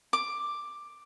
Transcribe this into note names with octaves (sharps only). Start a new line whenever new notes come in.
D6